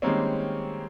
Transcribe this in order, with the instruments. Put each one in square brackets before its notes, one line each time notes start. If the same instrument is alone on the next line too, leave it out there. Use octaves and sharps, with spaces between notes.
[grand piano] D#3 G3 G#3 A#3 C4 C#4